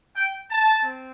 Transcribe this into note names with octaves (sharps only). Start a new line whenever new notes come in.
G5
A5
C4